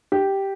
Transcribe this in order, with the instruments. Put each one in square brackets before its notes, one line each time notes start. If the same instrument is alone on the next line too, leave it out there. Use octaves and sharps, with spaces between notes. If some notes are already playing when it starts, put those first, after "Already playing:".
[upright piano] G4